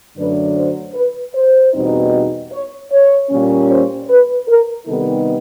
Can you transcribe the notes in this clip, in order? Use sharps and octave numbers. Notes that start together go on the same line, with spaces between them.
F#2 D3 F#3 A3 D4 B4
C5
B4
C5
E2 B2 G3 C4 D#4
C#5
C#5
A#2 G3 A#3 C#4
C5
B4
A#4
C3 D#3 G3 B3 D#4 A4